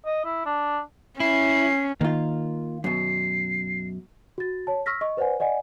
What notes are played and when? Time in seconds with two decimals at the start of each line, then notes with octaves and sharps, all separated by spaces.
0.05 D#5
0.24 E4
0.45 D4
1.20 C#4 E4 C7
2.01 D#3 A#3 F4
2.84 F#2 B2 C7
4.38 F#4 A6
4.67 C#5 A5
4.86 C#6 E6 F6 A#6 B6
5.01 D#5 C#6
5.17 B4 C5 D5 F#5 G#5
5.40 D5 D#5 F#5 G#5